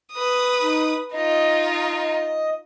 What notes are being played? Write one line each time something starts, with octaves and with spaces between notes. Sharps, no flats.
B4 D#6
D#4
D#4 F4 D#5